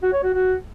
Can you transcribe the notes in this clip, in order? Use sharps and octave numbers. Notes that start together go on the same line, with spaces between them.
F#4
C#5
F#4
F#4